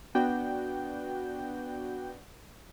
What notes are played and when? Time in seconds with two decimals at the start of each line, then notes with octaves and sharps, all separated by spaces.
0.15 B3 D4 F#4 G5